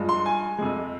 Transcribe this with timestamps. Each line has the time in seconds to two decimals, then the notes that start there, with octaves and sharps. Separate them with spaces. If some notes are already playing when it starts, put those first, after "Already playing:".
Already playing: G2 F3 G#3
0.09 C6
0.26 G#5
0.58 F2 C3 F3 G#3